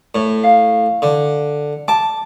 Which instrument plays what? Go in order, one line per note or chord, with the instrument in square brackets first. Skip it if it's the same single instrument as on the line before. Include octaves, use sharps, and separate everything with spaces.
[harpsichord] A2
[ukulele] F5
[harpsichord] D3
[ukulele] A5 [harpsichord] D6